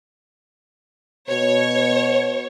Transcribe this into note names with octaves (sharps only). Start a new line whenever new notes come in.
B2 C#5